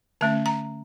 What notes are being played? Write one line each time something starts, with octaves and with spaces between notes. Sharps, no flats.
D3 A3 C#4 A5
A#5